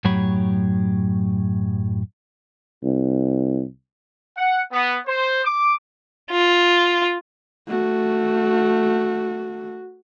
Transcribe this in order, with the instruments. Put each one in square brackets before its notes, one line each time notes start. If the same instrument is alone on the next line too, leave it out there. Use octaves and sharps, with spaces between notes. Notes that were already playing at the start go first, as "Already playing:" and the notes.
[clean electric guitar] F#2 A2 F#3 G4 C#5 B5
[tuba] C2
[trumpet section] F#5
B3
C5
D6
[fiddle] F4
[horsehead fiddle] A3 F#4